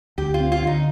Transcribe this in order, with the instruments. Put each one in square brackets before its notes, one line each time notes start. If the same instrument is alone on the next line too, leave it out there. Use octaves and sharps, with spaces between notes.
[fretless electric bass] D2 [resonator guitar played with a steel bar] G4
[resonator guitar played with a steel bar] F4
[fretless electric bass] C4
[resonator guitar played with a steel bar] F4
[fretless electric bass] D3
[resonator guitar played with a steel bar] D#4